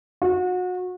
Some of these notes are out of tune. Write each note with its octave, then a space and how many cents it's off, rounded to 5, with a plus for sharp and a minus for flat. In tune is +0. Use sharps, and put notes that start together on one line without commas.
F#4 -30